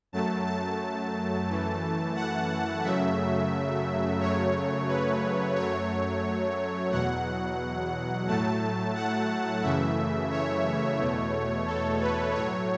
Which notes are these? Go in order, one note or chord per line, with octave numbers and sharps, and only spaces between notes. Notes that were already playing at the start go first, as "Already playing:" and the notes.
F#2 F#3 A3 A5
A5
F#2 E3 A3
F#5
F#2 C#3 F#3 A3 E5
F#2 C#3 F#3 A3 C#5
B4
F#2 F#3 A3 C#5
E2 B2 F#3 F#5
A2 F#3 A3 A5
F#5
F#2 C#3 E3 A3 E5
C#5
E2 B2 A3
A4
B4
A2 F#3 A3 C#5